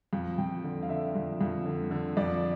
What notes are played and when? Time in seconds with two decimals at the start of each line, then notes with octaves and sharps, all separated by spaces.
0.13 F2
0.38 F2 G5
0.64 D3
0.83 F5
0.89 D3 E5
1.15 F2
1.41 F2
1.65 D3
1.91 D3
2.17 F2 D5